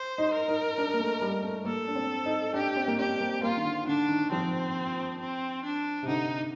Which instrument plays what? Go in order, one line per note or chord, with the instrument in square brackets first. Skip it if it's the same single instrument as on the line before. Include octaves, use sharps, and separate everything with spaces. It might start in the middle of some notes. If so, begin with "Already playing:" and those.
Already playing: [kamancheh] C5
[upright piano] D#4
[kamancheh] A#4
[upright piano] D#4
D4
A#3
A3
G3
A3
[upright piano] A#3 [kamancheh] A4
[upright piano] D4
C4
D#4
[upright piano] D4 [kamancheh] G4
[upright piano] C4
A#3
[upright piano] C4 [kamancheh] G4
[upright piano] A#3
[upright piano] A#3 [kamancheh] F4
[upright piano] D#3
D3
[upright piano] D3 [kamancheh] D4
[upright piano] D#3
[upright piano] F3 [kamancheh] C4
[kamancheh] C4
D4
[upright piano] C3
[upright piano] D3 [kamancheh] D#4